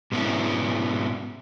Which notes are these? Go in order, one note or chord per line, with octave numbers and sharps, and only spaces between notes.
G#2 B2 B3 C#4 D4 E4